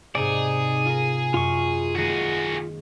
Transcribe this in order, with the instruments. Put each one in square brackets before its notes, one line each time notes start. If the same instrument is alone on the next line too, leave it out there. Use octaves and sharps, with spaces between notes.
[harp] G#2 C3 [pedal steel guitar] D#4 D5 [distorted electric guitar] G#4
[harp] F4 A#4
[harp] F#2 [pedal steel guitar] F4 C#6
[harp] D#3 G#3 A#3 [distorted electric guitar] F#4 G#4